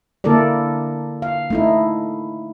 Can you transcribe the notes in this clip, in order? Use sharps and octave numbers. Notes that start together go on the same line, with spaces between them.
D3 A#3 E4 A4 A#4 D5
F5
A3 D#4 E4